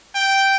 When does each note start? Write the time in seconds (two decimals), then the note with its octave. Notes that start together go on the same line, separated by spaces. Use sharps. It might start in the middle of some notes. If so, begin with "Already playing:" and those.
0.15 G5